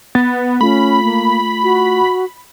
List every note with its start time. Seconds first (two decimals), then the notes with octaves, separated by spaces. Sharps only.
0.15 B3 A6
0.61 A3 C#4 F4 B5
1.04 A#3
1.63 F#4